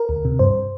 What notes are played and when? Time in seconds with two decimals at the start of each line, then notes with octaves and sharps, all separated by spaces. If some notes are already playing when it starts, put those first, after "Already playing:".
Already playing: A#4
0.09 D2
0.25 C3
0.39 G2 C5